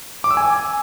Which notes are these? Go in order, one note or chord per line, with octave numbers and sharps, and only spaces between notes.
D6
E6
G#5